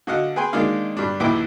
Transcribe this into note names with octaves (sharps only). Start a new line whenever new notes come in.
D3 F#4 D#5 F5 F#5
G#4 B4 G5 G#5 C6
D#3 G#3 A#3 D4 D#5 F5
G2 D4
A#1 D#2 E4 B4 G5 D6